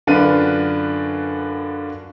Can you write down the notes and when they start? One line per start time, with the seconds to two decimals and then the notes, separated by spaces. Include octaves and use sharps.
0.07 F#2 D3 D4 F4 B4 D#7